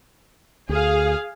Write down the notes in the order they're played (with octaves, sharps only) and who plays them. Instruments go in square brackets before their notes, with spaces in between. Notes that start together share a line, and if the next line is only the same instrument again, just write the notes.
[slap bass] D2 [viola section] G#4 F5